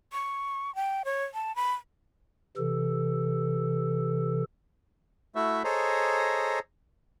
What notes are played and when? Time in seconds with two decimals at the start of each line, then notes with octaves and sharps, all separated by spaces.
0.13 C#6
0.75 G5
1.05 C#5
1.34 A5
1.56 B5
2.57 C3 E3 A4
5.35 A3 E4 F#4 E5
5.64 G#4 A4 C5 C#5 D#5 A#5